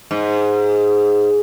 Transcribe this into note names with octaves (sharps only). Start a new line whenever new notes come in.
G#2